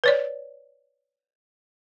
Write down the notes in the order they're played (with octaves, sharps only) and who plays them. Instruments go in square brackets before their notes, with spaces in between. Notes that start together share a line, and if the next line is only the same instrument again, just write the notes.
[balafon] B4 C#5 D5